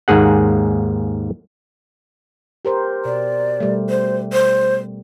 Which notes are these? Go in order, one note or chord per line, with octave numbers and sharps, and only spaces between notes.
D#2 G#2 A#3 G#4 F#5
G4 A#4 C5
B2 D5
B2 G3 A3
C5
C5